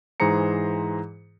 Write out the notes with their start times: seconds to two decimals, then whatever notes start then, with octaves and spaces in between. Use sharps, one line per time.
0.20 G#2 E3 G#4 C5 A#5 C#7